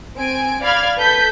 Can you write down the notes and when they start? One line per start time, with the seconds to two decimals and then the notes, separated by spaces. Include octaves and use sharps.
0.17 C4 G#5 D7
0.64 D5 F5 B5 F6 G#6
1.00 A4 B4 G6 B6